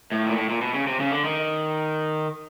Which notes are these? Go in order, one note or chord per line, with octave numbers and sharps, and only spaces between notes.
A2
A#2
A2
A#2
B2
C#3
C3
C#3
D3
D#3